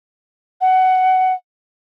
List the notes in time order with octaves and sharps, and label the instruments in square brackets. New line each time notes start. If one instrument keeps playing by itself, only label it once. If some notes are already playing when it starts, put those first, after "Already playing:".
[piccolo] F#5